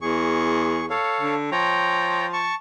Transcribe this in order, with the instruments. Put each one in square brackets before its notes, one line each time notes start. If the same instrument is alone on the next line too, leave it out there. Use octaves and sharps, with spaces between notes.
[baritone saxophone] E2 [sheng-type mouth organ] G#4 C#6
[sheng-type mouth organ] A4 C#5 F5
[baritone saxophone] D3
[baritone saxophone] F3 [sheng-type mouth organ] C#5 G5 A#5
[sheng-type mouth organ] A5 C#6